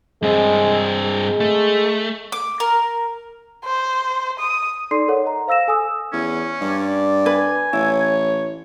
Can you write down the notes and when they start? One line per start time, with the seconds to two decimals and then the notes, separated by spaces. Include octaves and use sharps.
0.22 G2 G#3 C4
1.04 G#3
1.40 A3
2.32 D6
2.60 A#4
3.64 C5
4.39 D#6
4.91 D#4 A4 D5 C6 C7
5.08 A4 A#4 C#5 F#5
5.24 D#5 A#5
5.47 C5 F5 E6 A#6 E7
5.68 A4 G#5 D#6 E6
6.13 E2 C#4
6.61 G2 D5
7.26 B4 G#5
7.73 A1 E4 C#5